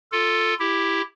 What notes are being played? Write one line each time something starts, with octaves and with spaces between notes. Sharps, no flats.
F4 A4
E4 G4